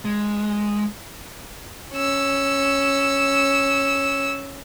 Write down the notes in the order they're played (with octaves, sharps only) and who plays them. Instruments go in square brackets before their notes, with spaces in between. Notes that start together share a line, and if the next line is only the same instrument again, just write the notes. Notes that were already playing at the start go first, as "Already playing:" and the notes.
[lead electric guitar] G#3
[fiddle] C#4 E6